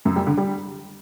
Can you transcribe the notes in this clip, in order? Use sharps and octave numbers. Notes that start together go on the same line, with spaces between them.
F#2
G3
D3
G3